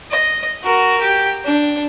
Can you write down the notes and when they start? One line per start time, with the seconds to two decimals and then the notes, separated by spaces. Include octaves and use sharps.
0.11 D#5
0.63 F#4 A#4
1.01 G4
1.45 D4